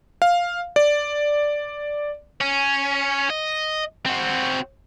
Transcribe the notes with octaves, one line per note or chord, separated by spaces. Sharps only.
F5
D5
C#4
D#5
C4 F#4